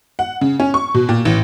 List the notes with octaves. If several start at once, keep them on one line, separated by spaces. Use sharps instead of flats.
F#5
C#3
C#4
C#6
B2
A#2
A1